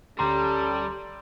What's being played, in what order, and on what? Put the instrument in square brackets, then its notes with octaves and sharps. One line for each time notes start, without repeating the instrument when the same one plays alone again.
[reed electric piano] D2 A#5 C6 [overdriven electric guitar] G3 [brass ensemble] C#4 G4 A4